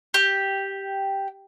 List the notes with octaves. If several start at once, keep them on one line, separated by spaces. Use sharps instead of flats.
G4